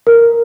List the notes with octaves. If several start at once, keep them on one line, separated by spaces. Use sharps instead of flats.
A#4